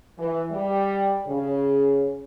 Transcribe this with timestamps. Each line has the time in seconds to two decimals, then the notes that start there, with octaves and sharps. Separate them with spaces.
0.17 E3
0.51 G3
1.26 C#3